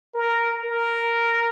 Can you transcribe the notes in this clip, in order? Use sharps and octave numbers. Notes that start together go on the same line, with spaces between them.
A#4
A#4